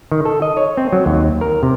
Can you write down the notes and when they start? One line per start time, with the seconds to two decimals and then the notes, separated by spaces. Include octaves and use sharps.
0.11 D#3
0.25 A4
0.42 D#5
0.57 C#5
0.77 C4
0.93 F#3
1.06 D#2
1.41 A#4
1.63 C3